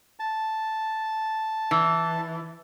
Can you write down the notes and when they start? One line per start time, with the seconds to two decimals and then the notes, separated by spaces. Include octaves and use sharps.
0.20 A5
1.71 E3